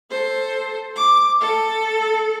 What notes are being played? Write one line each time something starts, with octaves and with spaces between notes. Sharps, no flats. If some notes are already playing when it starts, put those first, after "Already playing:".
A4 C5
D6
A4